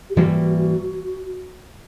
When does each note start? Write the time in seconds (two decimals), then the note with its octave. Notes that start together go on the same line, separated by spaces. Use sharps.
0.10 G4
0.16 G#2 E3 G3 A#3 F#4